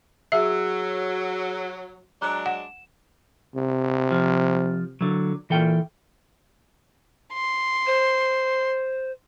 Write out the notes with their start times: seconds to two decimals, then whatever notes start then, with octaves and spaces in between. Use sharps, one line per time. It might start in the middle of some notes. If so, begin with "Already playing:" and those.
0.32 F#3 F#4 G#4 E5 E6
2.22 F#3 G#3 D4 A#5 D6 F#6
2.46 F#5 E7
3.55 C3
4.11 F3
5.01 D3 F#3
5.50 A#2 E3 A4 G5
7.31 C6
7.86 C5